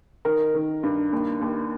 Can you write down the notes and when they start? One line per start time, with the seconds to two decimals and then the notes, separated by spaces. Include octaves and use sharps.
0.25 D#3 A#4
0.55 D#3
0.83 G2
1.12 D#2
1.41 D#2